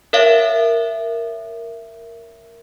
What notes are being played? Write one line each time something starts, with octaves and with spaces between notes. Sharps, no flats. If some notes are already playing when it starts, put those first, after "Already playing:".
A#4 C#5 E5 F5